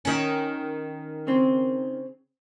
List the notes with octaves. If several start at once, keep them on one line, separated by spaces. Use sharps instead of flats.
D#3 C#4
C#3 C4